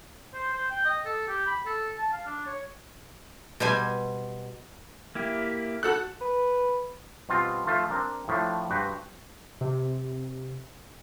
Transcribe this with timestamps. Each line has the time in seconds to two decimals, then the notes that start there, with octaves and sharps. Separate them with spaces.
0.34 C5
0.53 C5
0.71 G5
0.85 D#5
1.05 A4
1.28 G4
1.47 B5
1.66 A4
1.98 A5
2.13 F5
2.26 D4
2.46 C#5
3.60 B2 G3 C5 G#5
5.15 A#3 E4 G4
5.83 F#4 A4 F#6
6.21 B4
7.29 B2 G3 C4 F4
7.66 F3 A3 F4 A4 E5
7.90 C4 D4 A#4
8.28 A2 F3 A3 D4
8.70 G2 F#4 B4 C5 G5
9.61 C3